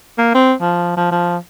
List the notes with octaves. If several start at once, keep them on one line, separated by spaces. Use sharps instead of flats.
A#3
C4
F3
F3
F3